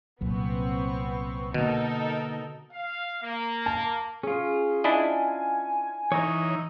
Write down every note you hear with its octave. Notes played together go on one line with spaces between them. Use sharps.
C2 A#2 F#3 B3 C4 C#6
B2 D3 A#3 D#4 A4 A#4
F5
A#3
A5
C#4 F4 G#4
D4 E4 D#5 G#5
E3 D#4 C#5 A#5